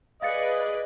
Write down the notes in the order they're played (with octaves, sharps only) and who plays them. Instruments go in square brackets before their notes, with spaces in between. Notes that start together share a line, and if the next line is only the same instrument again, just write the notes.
[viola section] G#4 B4 D5 [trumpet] D#5 [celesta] F5 A6 C#7